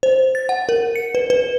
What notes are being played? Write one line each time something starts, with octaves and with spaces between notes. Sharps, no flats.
C5
A6
F#5
A#4
C#7
B4
B4